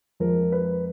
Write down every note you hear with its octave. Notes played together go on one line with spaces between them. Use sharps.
F2 F3 G#3 A#4
B4